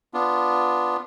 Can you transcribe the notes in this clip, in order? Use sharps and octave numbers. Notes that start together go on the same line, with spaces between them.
B3 D4 F4